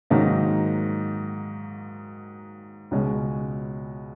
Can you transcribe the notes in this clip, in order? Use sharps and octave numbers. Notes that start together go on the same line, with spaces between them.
G#2 D#3 F#3 A#3 D#4
C#2 B2 G#3 C#4